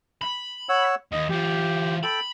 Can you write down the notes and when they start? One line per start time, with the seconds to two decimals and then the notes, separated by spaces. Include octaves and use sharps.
0.22 B5
0.69 C#5 F#5 E6
1.12 D#2 D#5
1.30 E3 F4 G4
2.03 A4 G5 B5